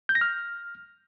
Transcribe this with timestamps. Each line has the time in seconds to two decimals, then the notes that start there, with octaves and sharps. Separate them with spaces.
0.09 G6
0.15 A#6
0.21 F6